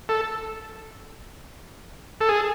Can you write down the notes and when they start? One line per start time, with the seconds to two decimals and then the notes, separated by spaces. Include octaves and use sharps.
0.09 A4
2.21 A4
2.29 G#4